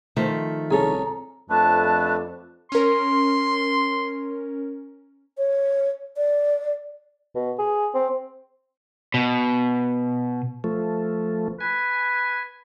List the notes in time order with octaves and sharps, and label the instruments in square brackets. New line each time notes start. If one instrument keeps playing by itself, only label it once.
[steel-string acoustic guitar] D#3 F3 A3 [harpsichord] E5
[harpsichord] C2 C#4 [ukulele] G#4 A4 [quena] A#5
[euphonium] F2 [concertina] A3 D4 B4 [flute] A5
[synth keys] C#4 A#4 [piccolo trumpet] C6
[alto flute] C#5
D5
[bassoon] B2
G#4
C4
[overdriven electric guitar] B2
[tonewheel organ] F3 A3
[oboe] B4 [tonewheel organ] G#5